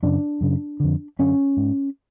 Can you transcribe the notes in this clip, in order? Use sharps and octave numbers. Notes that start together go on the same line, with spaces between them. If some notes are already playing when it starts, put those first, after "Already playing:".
F#2 C#3 D4
F#2 C#3
F2 D3
F#2 D3 C#4
G#2